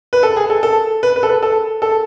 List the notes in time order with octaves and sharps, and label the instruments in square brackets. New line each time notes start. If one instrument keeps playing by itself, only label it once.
[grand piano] B4
A4
G#4
A4
A4
B4
B4
A4
B4
A4
A4